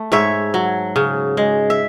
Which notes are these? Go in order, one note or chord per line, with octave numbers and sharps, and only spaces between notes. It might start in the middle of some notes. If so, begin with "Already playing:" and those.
Already playing: A3
G#2 C#5 E5
F#3
C#3
G#3
E5